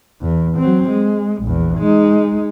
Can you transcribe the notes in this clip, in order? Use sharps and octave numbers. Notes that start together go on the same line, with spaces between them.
E2
F#3 C4
G#3
A#1 E2
G#3 D#4